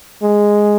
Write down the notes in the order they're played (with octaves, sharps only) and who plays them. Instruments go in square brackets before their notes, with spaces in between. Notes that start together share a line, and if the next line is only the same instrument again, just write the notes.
[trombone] G#3